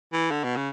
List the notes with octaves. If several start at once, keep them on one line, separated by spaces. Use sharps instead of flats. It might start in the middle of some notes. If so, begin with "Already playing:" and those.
E3
D3
B2
C#3